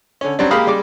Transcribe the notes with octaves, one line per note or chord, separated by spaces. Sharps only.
D3 C#4
F#3 G3 C4 D4
G#3 A#3 G4 F5 B5 D#6
G3 G#3 D6